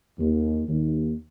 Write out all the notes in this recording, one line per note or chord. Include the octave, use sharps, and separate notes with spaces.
D#2
D#2